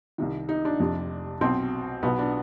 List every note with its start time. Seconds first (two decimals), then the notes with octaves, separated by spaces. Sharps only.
0.18 C2 C3 D#3
0.49 D#4
0.65 D4
0.79 F1 F2 C3
1.41 B1 B2 C4
2.03 B1 B2 B3
2.18 D4